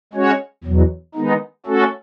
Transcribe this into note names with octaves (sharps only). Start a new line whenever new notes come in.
G#3 C#4 F#4 C#5
E2 B2 F#3
D#3 G#3 B3 D#4
A3 C#4 F#4 A4